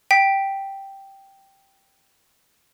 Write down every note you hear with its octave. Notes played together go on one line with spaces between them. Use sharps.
G5 B6